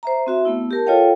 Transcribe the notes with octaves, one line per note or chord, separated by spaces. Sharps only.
C5 E5 A#5
C4 F#4 E5
A3 B3 E4
G4 A#4 A5
F4 A4 C#5 D#5 F5 G5